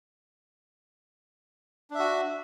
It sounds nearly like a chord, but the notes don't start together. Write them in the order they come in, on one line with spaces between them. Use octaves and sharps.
D4 E5 F#4